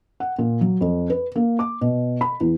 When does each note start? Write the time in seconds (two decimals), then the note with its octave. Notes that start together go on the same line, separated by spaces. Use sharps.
0.20 F#5
0.39 A#2
0.61 F#3
0.81 F2
1.10 B4
1.36 A#3
1.59 D6
1.81 B2
2.21 B5
2.40 E2